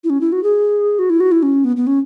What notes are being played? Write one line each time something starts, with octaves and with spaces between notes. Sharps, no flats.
E4
C#4
E4
F#4
G#4
F#4
E4
F#4
E4
C#4
B3
B3
C#4